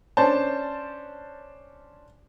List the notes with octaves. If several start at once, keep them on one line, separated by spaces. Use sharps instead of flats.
C#4 D4 C5 A5